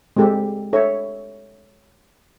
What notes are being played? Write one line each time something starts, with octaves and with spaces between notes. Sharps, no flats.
G#3 C4 G4 A4
A4 C#5 E5